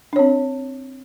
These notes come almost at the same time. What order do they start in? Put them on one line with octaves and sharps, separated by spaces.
D4 C#5 C4